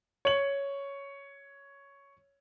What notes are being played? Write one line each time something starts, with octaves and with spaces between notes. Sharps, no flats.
C#5 F#7